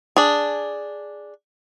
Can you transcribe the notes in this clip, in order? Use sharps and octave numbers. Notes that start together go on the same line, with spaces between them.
D4 G#4